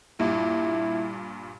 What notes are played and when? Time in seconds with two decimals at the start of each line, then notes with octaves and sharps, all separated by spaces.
0.20 G2 A#2 E4